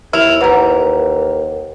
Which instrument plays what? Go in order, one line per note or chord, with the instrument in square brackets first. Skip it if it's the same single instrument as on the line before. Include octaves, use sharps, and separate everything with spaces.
[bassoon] D#2 [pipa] E4 [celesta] F6 F7
[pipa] C3 E3 [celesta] B4 F#5 A#5